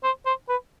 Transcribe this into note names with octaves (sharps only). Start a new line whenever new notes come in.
C5
C5
B4